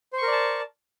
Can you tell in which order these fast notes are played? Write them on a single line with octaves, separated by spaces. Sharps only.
C5 C#6 A#4 D5 A5